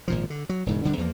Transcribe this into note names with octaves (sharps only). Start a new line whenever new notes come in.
G#1 A#2 F3
D3
F#3
E1 G#2 C#3
E1 D3 G3 D4
E2 F3 G#3 A#3